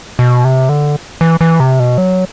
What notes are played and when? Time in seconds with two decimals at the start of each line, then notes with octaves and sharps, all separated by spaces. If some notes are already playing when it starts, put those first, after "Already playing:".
0.19 B2
0.45 C3
0.69 D3
1.21 E3
1.41 E3
1.60 C3
1.80 B2
1.98 F#3